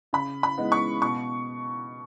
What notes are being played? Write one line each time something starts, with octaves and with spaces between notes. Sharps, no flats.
C#3 B5
B5
E3 G#3 B3 D#4
C#6
B2 C#6